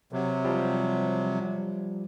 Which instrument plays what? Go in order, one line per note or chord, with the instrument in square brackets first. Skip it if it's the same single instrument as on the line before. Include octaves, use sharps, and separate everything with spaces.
[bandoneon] C3 F#3
[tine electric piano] F3 G3